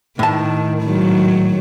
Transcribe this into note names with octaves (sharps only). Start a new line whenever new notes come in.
A2 D#3 A5
G#2 D#3 F#3